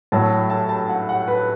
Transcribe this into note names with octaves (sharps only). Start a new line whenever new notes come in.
A2 F#3 A3 A5
A5
A5
F#5
F#5
B4